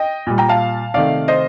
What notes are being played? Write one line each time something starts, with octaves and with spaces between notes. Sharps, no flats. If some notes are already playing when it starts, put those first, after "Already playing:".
Already playing: D#5 G5
A#2 G3
G5 A#5
F5 A5
C3 D#3 A3 D5 F5
C5 D#5